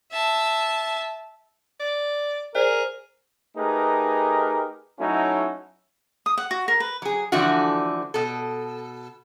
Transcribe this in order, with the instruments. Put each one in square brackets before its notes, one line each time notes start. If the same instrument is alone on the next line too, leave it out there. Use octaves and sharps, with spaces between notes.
[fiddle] E5 A5
[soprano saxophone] D5
[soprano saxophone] G#4 [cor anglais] A#4 [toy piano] C5 D5
[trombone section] A3 D#4 G4 G#4 A#4 B4
F#3 A3 C#4 D#4 E4 F#4
[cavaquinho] D#6
F#5
F#4
A#4
B4
[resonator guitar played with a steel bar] F#3 G#4
D3 E3 F3 A3 D4 F#4
B2 A4